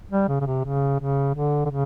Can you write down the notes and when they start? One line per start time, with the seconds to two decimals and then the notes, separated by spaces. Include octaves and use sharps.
0.11 G3
0.28 C#3
0.41 C#3
0.46 C3
0.64 C#3
0.99 C#3
1.35 D3
1.65 D3
1.70 C#3